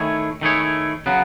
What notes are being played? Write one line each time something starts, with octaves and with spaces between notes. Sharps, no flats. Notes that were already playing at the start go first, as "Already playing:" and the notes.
Already playing: D#3 A3 E4 G#4 C#5
D#3 A3 E4 G#4 C#5
C#3 F#3 B3